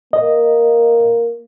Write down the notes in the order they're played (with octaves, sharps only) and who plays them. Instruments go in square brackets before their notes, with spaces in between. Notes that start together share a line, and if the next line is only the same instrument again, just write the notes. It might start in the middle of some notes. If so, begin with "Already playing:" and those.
[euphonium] A#3 [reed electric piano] D#5